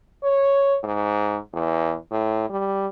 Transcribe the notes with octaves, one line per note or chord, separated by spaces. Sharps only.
C#5
G#2
E2
A2
G3